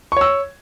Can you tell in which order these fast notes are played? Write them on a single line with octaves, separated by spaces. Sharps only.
C#6 C#5 E6